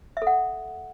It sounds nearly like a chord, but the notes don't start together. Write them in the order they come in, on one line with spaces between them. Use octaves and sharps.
E5 A4 F#5